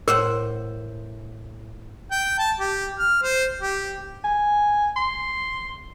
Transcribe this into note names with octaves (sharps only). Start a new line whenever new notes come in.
A2 A#4 C5 F#5
G5
A5
G4
F6
C5
G4
G#5
C6